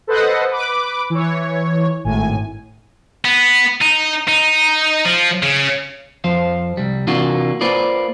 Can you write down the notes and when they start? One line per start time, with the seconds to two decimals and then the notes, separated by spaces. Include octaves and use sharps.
0.07 A4 B4 C5 D#5 F#5
0.50 B4 D6
1.10 E3 C#5
2.04 G#1 A2 G#5
3.25 B3
3.81 D#4
4.28 D#4
5.05 F3
5.43 C#3
6.24 F2 F3 C5 F5
6.77 C2 G3
7.07 C3 E3 A#3 D4 F4 F#4
7.61 A#3 F4 B4 C5 D5